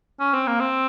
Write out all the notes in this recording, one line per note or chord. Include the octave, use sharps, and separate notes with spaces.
C#4
C4
A#3
C4